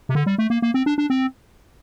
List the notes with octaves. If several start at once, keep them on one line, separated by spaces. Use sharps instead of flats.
C3
D3
G3
A3
A#3
A#3
C4
D4
D4
C4